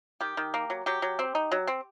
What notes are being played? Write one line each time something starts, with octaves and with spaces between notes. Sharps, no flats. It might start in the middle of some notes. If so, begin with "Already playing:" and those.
D#3 G4
D#3
A#3
F#3
F#3 G4
F#3
C4
D#4
F#3
C4